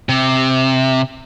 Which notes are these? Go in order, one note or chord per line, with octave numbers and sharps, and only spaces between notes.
C3